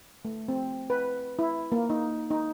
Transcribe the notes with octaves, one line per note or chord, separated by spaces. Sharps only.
A3
C4
B4
E4
A#3
D#4
D#4